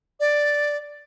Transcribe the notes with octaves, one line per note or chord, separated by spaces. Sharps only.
D5